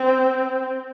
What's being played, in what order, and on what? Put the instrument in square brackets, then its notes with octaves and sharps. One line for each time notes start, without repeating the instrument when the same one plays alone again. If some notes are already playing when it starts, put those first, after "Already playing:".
Already playing: [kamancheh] C4